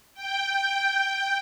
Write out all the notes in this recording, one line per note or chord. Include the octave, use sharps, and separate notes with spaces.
G5